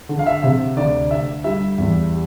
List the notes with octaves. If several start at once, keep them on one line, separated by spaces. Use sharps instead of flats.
D3
F5
E5
C3 E5
D2 D5
D2 E5
G3 E5
E2